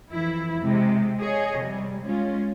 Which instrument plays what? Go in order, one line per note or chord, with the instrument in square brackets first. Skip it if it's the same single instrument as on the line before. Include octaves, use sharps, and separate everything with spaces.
[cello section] F2 E3 E4
C3 G#3
G#4 C#5 D#5
C3 G3
G#3 C#4 F4